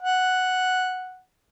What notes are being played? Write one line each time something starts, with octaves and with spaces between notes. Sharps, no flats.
F#5